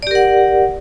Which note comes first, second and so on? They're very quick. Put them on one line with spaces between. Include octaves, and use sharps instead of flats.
D5 G4 A#4 F#5